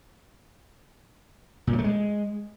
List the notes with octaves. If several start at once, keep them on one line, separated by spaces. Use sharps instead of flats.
A#2
F#3
A3
G#3